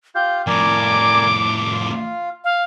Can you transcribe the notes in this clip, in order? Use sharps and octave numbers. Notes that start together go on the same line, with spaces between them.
F4 G4 F5 G6
F2 A2 A#4 D5 G#5 D6
F4 F5
F5